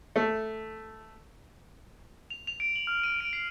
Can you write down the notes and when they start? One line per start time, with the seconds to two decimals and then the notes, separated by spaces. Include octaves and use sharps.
0.16 A3
2.30 F7
2.47 F7
2.60 D7
2.76 F#7
2.87 F6
3.03 D#7
3.20 D7
3.33 C7